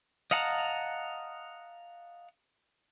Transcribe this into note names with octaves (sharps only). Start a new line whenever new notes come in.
D#5 F5 F#5 A5 A#5